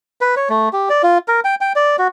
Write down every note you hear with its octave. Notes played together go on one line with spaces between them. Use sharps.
B4
C#5
A3
G4
D5
F4
A#4
G5
G5
D5
F#4